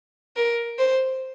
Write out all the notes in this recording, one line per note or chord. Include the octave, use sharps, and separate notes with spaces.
A#4
C5